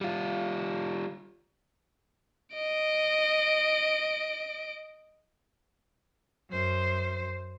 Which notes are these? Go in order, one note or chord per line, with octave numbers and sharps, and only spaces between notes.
G3 F4
D#5 D7
F#2 C5